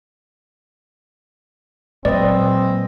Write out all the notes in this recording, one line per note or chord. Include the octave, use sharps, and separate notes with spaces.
A#2 F#3 G#3 C4 B4 D5 D#5